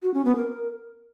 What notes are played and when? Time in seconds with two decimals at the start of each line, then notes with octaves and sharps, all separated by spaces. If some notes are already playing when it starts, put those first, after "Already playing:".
0.03 F#4
0.14 C#4
0.25 B3
0.36 A#4